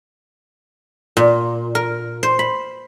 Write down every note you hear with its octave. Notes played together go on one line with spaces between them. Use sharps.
A#2
A#4
C5
B5